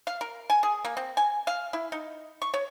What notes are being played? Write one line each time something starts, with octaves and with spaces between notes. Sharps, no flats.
F5
A#4
G#5
G#4
A#3
C4
G#5
F5
E4
D#4
C#6
C#5